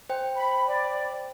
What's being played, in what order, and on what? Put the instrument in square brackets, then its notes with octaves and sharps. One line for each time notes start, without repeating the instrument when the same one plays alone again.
[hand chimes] C5 G5
[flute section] B5
D5